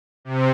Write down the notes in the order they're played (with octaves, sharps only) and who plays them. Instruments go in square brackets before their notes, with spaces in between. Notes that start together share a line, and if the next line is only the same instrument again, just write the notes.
[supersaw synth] C3